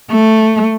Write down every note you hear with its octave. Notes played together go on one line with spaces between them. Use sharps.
A3